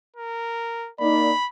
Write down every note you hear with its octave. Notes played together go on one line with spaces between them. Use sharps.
A#4
A#3 D#4 D5 B5